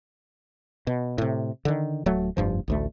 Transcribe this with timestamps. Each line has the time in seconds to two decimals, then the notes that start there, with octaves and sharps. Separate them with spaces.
0.87 B2
1.18 A2 C3
1.65 D3 D#3
2.06 D1 F#3 A3
2.37 F1 G2 F3
2.68 A1 D2 A3